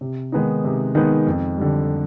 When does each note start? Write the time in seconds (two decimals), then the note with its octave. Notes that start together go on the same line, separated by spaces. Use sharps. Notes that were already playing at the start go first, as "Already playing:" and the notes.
0.01 C3
0.32 D#3 G#3 B3 D#4
0.64 C3
0.95 D#3 G#3 B3 D#4
1.27 F2
1.58 D3 G3